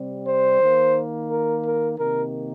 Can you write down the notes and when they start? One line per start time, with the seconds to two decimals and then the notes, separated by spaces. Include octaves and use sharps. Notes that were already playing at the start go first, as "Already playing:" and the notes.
Already playing: C3 G3 C4
0.27 C5
0.61 D#3 A#3
1.29 A#4
1.64 A#4
1.98 C3 D#3 A#3 A#4